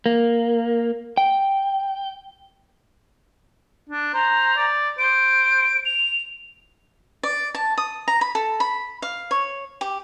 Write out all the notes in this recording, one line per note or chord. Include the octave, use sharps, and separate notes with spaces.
A#3
G5
D4
C5 A#5
D5
C5 D7
F7
D5
A5
D#6
A#5
B5
A4
B5
F5
C#5
G4